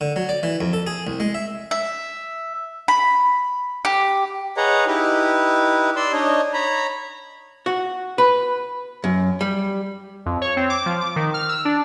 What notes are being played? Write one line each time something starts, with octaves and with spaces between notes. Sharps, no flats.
D3
F#3
D5
E3
F2
A4
G#4
C2
G#3
E5
E5
B5
G4
G#4 B4 C#5 D#5 F#5 A#5
D#4 E4 G4 B4
D5 C6 E6
D4 D#4 C#5 D#5
C#5 A#5 B5
F#4
B4
F#2
G3
F2
C#5
C4
D6
F3
D6
D#3
F6
E6
D4